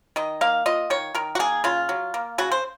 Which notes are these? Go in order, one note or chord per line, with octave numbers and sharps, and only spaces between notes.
D#3 D#5
A#3 F5
F4 D#5
D#3 C#5
D#3 A#4
F#4
A#3 G#4
C#3 F4
F#3
A#3
C#3 F#4
C5